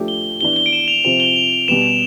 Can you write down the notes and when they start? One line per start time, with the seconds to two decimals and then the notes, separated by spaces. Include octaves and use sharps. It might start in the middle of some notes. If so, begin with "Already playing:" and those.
Already playing: F3 A3 D4 G4
0.08 G7
0.41 E3 B3 D4 G7
0.56 G7
0.66 D7
0.73 E7
0.88 F7
1.04 C3 F3 C4 F7
1.20 G7
1.36 F7
1.68 B2 G3 B3 E7